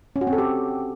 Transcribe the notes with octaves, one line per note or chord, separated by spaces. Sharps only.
C#4
F#4
C4
A4
G4